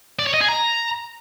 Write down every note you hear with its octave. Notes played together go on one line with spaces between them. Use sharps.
D5
C#5
D#5
G#4
A#5